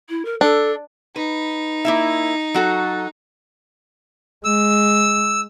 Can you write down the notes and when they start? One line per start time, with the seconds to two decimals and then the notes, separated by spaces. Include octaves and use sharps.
0.10 E4
0.25 A#4
0.41 D4 A4
1.16 D#4 B4
1.85 A#3 E4 E5
2.54 F#3 F#4 A4
4.45 G#3 E6